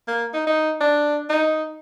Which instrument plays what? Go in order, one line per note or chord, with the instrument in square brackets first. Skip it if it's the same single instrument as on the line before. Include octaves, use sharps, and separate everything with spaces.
[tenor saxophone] A#3
D#4
D#4
D4
D#4